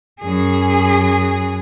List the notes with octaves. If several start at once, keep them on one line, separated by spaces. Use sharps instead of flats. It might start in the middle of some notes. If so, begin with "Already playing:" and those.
F#2 G#4